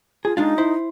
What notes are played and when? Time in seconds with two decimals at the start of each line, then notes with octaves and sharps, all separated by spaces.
0.25 F4 G#4
0.37 G#3 D4 D#4 F4
0.58 E4 C5